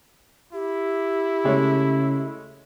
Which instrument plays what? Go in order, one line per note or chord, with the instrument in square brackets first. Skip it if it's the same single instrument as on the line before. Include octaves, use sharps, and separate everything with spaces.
[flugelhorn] E4 [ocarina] G4
[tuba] C#3 [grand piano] G#3 A3 C#5